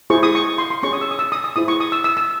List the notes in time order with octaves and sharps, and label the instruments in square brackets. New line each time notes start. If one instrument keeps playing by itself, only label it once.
[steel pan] E4 G#4 C5 C#6
D#6
C#6
C6
C6
C#4 G#4 C#5 C#6
D#6
E6
D#6
E6
D#6
D#6
E4 G#4 C5 D#6
C#6
D#6
E6
E6
E6